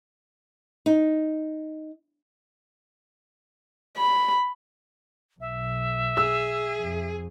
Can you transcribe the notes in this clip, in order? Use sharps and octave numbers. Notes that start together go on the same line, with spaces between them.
D#4
B5
B1 E5
G#4 E6
F2